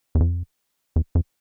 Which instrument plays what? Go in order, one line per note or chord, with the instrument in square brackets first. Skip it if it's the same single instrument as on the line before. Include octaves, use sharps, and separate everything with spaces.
[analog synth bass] E2
F2
E2
F2